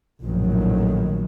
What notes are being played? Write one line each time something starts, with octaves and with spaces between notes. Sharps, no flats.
A#1 F#2 A2 D#3 F3 F#3